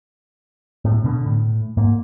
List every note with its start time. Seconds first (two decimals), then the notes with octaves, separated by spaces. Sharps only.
0.85 A2
1.04 B2 D3
1.26 A2
1.77 G#2 A#3